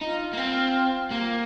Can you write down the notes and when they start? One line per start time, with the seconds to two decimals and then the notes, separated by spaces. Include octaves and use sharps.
0.01 D#4 F4
0.33 A#3
0.37 C4
1.11 A#3 G4
1.22 F4